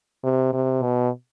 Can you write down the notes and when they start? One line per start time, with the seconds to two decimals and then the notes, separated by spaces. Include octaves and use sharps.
0.24 C3
0.53 C3
0.82 B2